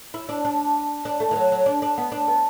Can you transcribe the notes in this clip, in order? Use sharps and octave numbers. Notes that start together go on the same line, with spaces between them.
E4
D4
D4
D4
A3
E3
F#3
F#3
D4
D4
B3
D4
B3